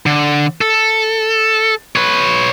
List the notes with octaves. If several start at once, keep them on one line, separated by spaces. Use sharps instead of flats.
D3
A4
B4 C#5